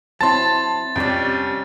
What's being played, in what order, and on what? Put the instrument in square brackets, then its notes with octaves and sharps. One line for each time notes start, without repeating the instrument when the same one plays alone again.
[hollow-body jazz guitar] F#3 C4 E4 [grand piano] A5 C6 [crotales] A6
[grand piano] F2 [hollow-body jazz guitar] C3 G3 D4 [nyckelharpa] C#4 G4